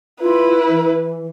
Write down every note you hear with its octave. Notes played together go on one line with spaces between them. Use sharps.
E4 F4 B4
E3